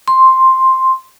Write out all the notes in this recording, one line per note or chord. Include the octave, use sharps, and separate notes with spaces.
C6